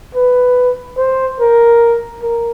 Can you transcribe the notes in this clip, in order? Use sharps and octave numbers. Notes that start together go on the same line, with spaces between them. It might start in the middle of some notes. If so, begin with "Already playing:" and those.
B4
C5
A#4
A#4